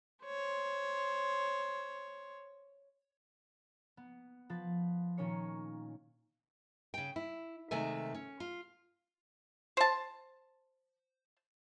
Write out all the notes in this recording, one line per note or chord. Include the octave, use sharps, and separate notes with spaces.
C5 C#5
B3
F3 B4 A6
A#2 D#3 C#4 A#4 C#5 C#7
C#3 G5
E4
C3 D#3 G#3 A3 E5 G#5
C#4
F4
C5 A5